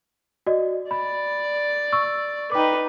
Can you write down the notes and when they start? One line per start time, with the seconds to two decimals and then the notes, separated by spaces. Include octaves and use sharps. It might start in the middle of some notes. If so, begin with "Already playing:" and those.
0.46 F#4 D5 D#5
0.91 D5 B5
1.92 C#6 E6
2.52 D#4 B4 G5 D6